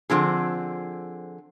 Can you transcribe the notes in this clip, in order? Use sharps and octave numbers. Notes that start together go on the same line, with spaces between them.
D3 F3 C4 G#4